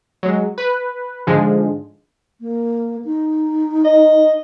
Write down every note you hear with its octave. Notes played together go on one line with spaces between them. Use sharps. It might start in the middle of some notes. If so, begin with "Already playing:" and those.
F#3 G#3
B4
G#2 D3 F3 G#3
A#3
D#4
D#5